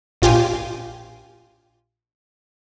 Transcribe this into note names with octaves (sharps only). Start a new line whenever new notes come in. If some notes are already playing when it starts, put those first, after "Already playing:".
A#1 F4 G4 G#5